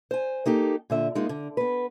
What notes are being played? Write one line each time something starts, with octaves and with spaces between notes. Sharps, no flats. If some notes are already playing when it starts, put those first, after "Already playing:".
C5 G#5
A#3 D#4 G4 A4
A#2 D3 E5
G#3 A#3 D#4 F4
D3
B3 B4